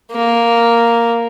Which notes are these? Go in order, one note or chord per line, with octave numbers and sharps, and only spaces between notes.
A#3